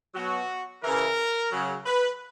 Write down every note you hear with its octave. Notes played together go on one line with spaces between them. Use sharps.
B2 F#3 F#4
C#3 E3 A#4
C#3 F#3
B4